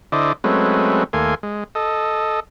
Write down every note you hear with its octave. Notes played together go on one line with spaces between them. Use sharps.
D3 E4 C5 D5 D#5
F#3 G#3 A3 C4 C#4 B4
D#2 A3 A#3 G#5 C6
G#3
A4 D#5